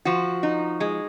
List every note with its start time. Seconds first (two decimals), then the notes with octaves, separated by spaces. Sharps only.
0.05 F3 F#4
0.43 D#4
0.80 G#3